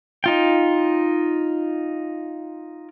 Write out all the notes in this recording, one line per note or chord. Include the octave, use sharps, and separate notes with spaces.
D#4 F4 G5